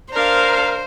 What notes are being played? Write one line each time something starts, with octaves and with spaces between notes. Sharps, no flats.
D4 A#4 C5 F5